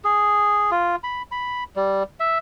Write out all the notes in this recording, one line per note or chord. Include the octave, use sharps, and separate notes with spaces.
G#4
F4
B5
B5
G3
E5